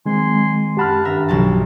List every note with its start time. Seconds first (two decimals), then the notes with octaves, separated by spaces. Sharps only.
0.06 D#3 F#3 G#3 C4 G#5 C6
0.77 F#2 G4 F#5 A5 B5 F6
1.05 G2 D#3 E5 A#5
1.29 B1 F3 A5